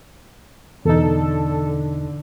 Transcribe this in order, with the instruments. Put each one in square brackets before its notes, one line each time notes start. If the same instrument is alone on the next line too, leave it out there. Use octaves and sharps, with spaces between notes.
[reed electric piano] E2 B2 D#4 [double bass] D3 [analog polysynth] A4